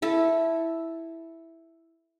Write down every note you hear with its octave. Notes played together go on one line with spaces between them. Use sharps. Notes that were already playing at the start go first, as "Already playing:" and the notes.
E4 A4